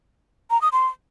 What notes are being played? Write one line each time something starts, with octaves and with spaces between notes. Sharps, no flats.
A#5
D#6
C6